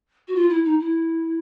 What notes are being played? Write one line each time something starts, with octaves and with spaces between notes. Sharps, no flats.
F#4
F4
E4
D#4
E4